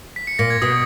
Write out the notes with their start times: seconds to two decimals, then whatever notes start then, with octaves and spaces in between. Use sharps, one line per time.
0.16 B6
0.27 C#7
0.39 A#2 A#6
0.50 G#6
0.62 B2 D#6